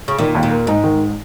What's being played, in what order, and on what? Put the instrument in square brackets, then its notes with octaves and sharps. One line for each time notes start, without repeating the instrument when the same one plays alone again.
[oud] C#3
[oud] A#2 [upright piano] D#3
[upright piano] D#2
[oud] A#2
[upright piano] A#3
[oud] G#2 [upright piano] D#4
[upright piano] D#3